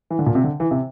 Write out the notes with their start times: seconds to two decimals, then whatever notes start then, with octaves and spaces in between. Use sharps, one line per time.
0.10 E3
0.19 D3
0.26 A#2
0.35 C3
0.44 D3
0.60 E3
0.71 C3